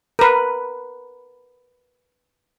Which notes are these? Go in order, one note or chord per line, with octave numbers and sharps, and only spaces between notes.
A#4 B4